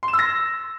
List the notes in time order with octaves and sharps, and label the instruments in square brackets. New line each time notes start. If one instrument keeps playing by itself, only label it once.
[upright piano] C6
E7
E6
A#6